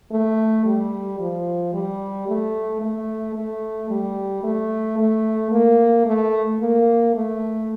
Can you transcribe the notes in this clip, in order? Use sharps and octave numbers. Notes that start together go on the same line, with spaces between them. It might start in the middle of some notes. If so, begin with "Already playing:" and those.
A3
G3
F3
G3
A3
A3
A3
G3
A3
A3
A#3
A3
A#3
A3